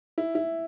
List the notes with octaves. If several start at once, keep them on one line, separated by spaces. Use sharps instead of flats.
E4
E4